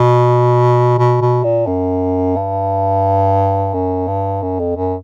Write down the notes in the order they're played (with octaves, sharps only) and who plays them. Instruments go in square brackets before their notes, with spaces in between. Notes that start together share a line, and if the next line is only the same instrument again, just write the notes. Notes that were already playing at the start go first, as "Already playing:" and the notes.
Already playing: [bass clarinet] B2
B2
B2
A#2
F#2
G2
F#2
G2
F#2
F2
F#2